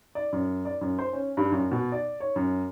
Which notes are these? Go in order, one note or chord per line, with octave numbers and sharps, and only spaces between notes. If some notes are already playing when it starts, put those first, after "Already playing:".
D5
F#2
D5
F#2
C5
C#4
G2
F#2
B2
D5
C#5
F#2